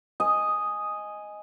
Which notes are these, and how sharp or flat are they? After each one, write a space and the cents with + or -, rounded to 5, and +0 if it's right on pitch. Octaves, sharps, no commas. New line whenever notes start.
D#5 +0 G#5 +0